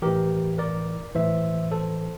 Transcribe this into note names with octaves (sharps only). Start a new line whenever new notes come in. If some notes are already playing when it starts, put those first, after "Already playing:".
A2 E3 G4 A#4
A#4 D5
A2 E3 C5 E5
A4 C5